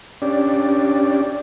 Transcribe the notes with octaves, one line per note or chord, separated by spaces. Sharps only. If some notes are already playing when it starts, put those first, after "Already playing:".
C#4 D4 G4 D5